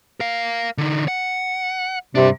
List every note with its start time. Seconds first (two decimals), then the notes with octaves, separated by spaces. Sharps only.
0.20 A#4 F5
0.78 D3 D#4
1.08 F#5
2.15 G2 C3 D4